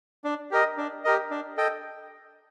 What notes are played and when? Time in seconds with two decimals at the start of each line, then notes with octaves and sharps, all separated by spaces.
0.24 D4
0.51 G4 A#4 D#5
0.77 D4
1.04 G4 A#4 D#5
1.30 D4
1.57 A4 D#5 G5